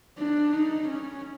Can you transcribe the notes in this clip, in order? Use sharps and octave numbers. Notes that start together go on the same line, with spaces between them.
D4
D#4
C#4